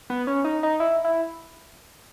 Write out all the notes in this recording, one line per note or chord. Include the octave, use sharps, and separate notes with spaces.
B3
C#4
D#4
D#4
E4
E4